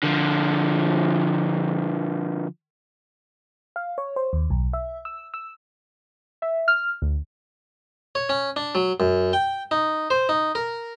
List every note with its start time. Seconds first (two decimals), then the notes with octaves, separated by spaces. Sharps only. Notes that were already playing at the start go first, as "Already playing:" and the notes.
0.03 D3 F3
3.76 F5
3.98 C#5
4.16 C5
4.33 D#2
4.50 B1
4.73 E5
5.05 E6
5.34 E6
6.42 E5
6.68 F6
7.02 D2
8.15 C#5
8.29 C#4
8.56 D4
8.75 F#3
9.00 F#2
9.33 G5
9.71 D#4
10.10 C5
10.29 D#4
10.55 A#4